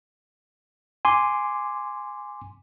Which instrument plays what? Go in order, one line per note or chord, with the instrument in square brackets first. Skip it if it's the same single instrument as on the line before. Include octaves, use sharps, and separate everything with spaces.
[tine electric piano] G#5 C6 D6